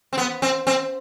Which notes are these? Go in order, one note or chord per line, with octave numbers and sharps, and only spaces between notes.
C4
B3
C4
C4